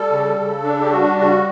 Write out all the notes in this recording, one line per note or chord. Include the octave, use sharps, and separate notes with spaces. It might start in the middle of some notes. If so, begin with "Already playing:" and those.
Already playing: G3 A4
C#3
C#3
D4
G4
G3 F#4
C#3 F#4